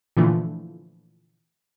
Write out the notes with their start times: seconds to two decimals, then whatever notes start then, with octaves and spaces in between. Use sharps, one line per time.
0.17 A#2 D3 E3 F3 A3